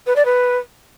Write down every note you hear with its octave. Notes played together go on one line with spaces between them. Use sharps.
B4
D5
B4